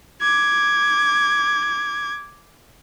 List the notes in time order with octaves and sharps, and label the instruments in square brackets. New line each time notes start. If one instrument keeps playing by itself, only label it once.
[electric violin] D6 G#6